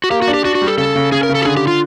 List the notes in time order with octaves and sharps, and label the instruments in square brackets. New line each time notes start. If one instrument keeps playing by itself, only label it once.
[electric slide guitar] F#4
[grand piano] A#3 [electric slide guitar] G4
[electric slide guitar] F#4
[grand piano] D4
[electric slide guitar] G4
[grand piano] D4 [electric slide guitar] F#4
[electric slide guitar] F#4
[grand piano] G3
[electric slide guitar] A4
[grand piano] C#3 [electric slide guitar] A4
[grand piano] C#3
[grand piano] C#3 [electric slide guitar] G#4
[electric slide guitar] A#4
[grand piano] C#3
[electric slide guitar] A4
G4
[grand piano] D3 [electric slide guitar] G#4
[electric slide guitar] G4
F4